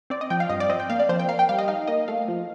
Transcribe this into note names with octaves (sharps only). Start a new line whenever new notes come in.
C4 D5
D#5
F3 G5
F5
G2 D#5
D5
C4 D#5
G5
A#3 F5
D5
F3 C5
G5
A#3 F5
G5
G3 F5
D#5
D#4 F5
A#3 D#5
A3 F5
F3